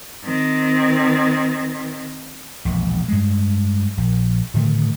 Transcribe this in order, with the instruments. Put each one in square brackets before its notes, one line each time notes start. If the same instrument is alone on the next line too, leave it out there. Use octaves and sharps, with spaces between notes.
[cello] D#3 C4
[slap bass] E1 A#1
G2 G#3
A#1
A2 D3 D#3 A3